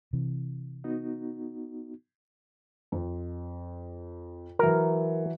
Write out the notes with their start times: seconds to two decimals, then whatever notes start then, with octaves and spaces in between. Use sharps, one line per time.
0.13 C3 E3
0.84 B3 D#4 F#4
2.92 F2
4.59 E3 F#3 A#4